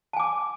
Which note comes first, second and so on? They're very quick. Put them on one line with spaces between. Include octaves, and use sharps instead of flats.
A5 G#5 D6